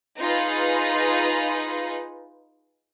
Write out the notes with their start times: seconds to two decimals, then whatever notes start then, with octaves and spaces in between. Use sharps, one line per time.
0.20 D#4 F4 G#4 B4